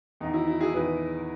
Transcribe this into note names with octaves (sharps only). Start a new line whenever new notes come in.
E2 D#3 D#4
E4
E4
E4 G#4
E2 D#3 G#4 B4